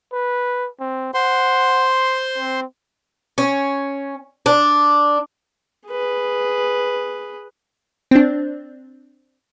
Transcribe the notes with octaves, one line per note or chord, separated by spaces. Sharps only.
B4
C4
C5 F#5 C6
C4
C#4
D4
G#4 B4
C4 D4